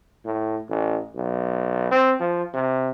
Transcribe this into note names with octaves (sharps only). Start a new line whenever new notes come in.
A2
A1
B1
C4
F3
C3